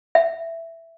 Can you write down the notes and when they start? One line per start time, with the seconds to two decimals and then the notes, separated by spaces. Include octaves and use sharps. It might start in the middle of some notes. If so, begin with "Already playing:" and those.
0.15 E5